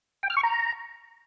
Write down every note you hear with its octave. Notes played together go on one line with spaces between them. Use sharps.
G5
F6
C#6
A#5